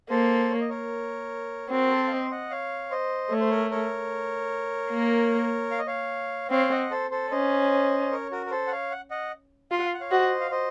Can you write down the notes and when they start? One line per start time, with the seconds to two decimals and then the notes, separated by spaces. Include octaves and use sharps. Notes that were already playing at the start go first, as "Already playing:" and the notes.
0.10 A#3 A4 C5
0.51 C#5
0.61 D#5
0.69 A#4 C#5
1.71 C4 F#4 A#4
1.90 A4 C5
2.07 F5
2.10 C5 D#5
2.31 D#5 F#5
2.50 C#5 F5
2.90 C5 D#5
3.31 A3 C#5
3.40 C5
3.50 A#4 C#5
3.70 A#4 C#5
4.91 A#3
5.71 F5
5.79 D#5
5.87 C#5 F5
6.51 C4 C#5 F5
6.71 D#5 F#5
6.91 A4 C5
7.11 A4 C5
7.31 C#4 C5 D#5
8.11 A#4 C#5
8.31 F#4 A#4
8.46 A#4
8.51 A4 C5
8.67 F#5
8.72 C#5 F5
8.91 F#5
9.11 D#5 F#5
9.71 F4 F5
9.78 F#5
9.85 F5
9.94 F#5
10.01 C#5 F5
10.11 F#4 C5 D#5
10.40 F5
10.51 C5 D#5